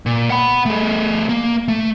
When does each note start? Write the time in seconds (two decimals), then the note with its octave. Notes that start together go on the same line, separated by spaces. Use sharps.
0.06 A#2
0.30 F#5 B5
0.66 A3 G#4
1.29 A#3
1.68 A3